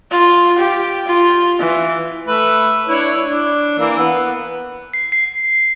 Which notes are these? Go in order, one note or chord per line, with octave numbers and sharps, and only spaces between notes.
F4
G4
F4
E3
A3 B4 E5
D4 E4 C#5
D4
E3 A#3 E6
B3 B4
C7
C7